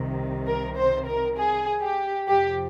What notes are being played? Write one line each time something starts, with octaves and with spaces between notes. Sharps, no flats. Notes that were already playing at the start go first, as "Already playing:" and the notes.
Already playing: C2 C3 D#3
A#4
C5
A#4
G#4
G4
F2 C3 F3 G4